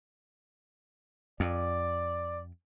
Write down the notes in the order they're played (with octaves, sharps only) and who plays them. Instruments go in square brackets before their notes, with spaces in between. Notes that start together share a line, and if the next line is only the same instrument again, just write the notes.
[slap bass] F2 [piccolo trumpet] D5